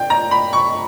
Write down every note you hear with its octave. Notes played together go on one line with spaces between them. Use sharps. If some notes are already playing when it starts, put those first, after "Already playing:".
Already playing: D4 G5
A#5
B5
C#6